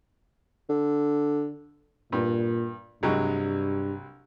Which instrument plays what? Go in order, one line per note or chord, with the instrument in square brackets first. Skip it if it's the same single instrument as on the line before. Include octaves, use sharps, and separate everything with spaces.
[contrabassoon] D3
[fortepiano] G2 [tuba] A#2
[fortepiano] C2 F#3 G#3 [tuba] G2